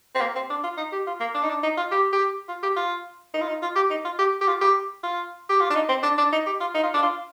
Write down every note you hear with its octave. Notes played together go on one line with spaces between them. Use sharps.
C4
A#3
C4
D4
F4
D#4
G4
F4
A#3
D4
D#4
D4
D#4
F4
G4
G4
F4
G4
F4
D#4
F4
D#4
F4
G4
D#4
F4
G4
G4
F4
G4
F4
G4
F4
D4
D#4
C4
D4
D4
D#4
G4
F4
D#4
F4
D4
F4